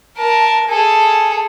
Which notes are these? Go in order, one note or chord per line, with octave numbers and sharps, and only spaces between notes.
A#4 A5
G#4 A4